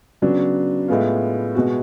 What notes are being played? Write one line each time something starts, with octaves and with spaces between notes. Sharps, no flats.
C#3 F#3 B3 D4
A2 G#3 B3 F4
B2 G#3 B3 F#4